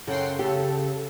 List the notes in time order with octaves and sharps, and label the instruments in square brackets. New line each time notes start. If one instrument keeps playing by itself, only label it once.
[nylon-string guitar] F#2 C#3 A4 [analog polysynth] F#5 G5 C6
[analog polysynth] C#3 A4 [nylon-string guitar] G4